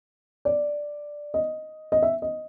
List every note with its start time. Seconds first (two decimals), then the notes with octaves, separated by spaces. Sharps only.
0.45 D5
1.34 D#5
1.92 D#5
2.02 E5
2.22 D#5